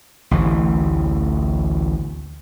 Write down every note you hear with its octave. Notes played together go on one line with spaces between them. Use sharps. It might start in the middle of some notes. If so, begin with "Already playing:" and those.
A1 D2 E3